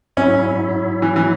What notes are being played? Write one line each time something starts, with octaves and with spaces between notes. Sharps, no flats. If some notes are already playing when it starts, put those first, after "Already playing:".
G#2 F#3 C#4 E4
E3
E3